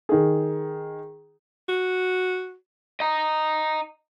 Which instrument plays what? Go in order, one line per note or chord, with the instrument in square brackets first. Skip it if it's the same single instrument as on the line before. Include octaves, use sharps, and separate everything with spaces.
[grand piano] D#3 G#4
[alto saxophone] F#4
[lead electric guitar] D#5 A#5